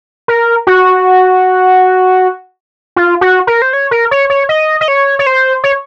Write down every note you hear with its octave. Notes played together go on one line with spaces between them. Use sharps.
A#4
F#4
F4
F#4
A#4
C5
C#5
A#4
C#5
C#5
D#5
D#5
C#5
C#5
C5
C#5